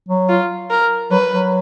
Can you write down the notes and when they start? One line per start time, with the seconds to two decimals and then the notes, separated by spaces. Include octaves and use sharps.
0.09 F#3
0.29 F4
0.71 A#4
1.11 F#3 B4
1.32 F#3